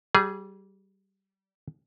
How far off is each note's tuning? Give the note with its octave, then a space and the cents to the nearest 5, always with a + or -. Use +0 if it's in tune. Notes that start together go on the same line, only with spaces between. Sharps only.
G3 -25 G#4 +0